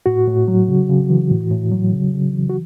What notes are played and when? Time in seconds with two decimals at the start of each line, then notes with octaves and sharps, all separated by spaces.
0.06 A2 F#4
0.27 A2
0.48 F#3
0.68 C#3
0.90 C#3
1.10 E3
1.31 A2
1.51 A2
1.72 F#3
1.93 C#3
2.13 C#3
2.34 E3
2.49 F#4